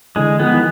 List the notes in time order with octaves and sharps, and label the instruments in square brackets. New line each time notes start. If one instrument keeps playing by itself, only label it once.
[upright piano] D3 E3 [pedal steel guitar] G#3
[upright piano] D#3 F3 [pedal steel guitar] B3
[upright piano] E3